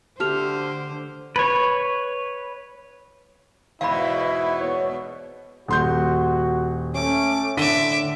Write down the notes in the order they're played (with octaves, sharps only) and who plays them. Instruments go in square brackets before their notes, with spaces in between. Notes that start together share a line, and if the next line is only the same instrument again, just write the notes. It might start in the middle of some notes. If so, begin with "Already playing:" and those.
[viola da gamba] D3 C5 [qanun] A3 G4 E5 [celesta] A5 F6 F7
[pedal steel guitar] B4 C#5
[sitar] E2 G#2 B2 [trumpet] E4 [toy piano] F5 B5
[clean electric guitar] B3 C#5
[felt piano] D#1 C6 G6 [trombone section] F#4
[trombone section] A3 C#4 [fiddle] D6
[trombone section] A2 [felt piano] D3 B6 D#7 [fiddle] E5 D6